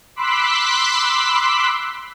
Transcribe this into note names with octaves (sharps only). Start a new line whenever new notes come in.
B5 C6 D6 E6 F#6 B6